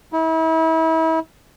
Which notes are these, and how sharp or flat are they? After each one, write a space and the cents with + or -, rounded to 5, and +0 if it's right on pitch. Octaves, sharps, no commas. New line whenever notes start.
E4 -35